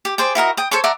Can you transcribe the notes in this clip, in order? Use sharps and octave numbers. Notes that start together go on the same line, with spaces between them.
G4
G#4 C5 D5 G5
E4 F#4 A#4 D#5
G5 D#6
A4 C5 C#5 C#6
D5 E5 F#5 A#5